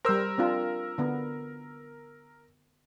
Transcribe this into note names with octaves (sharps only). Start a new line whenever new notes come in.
G3 A#4 C5 E6
C4 D4 F4
D3 B3